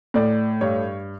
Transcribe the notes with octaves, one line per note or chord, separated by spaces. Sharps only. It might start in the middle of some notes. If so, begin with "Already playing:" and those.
A2 D5
G2 C#5